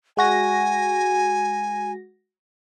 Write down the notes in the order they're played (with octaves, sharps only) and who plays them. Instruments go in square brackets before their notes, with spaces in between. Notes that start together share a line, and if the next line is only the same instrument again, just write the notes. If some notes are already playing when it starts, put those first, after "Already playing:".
[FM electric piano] G#3 F#4 A#6 [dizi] G#5